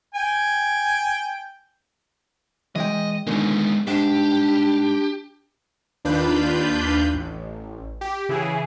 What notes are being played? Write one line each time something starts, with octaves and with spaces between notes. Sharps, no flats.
G5 G#5
E3 G#3 D#5 G5
A#2 D3 D#3 G#3 B3
G#2 D4 G4
D#2 D4 F4 B4 B5 G6
A1
G4
C#3 E3 E4 G#4